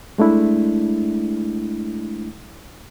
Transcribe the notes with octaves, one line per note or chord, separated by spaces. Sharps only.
G#3 A3 D4 E4